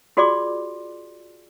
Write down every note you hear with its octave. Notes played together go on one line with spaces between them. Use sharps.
F4 F#4 G#4 D5 C6 D6